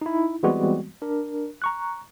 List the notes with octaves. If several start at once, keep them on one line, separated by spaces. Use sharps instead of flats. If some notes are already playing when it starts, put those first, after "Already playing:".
D#4 E4
E3 G3 G#3 B3 C4 F#4
D4 A#4
A#5 C#6 F#6